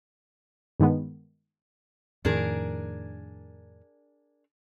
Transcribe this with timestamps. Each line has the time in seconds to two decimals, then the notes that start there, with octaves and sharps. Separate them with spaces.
0.80 G2 D#3 G#3 B3
2.25 F2 A2 D#3 D4 G#4 A#4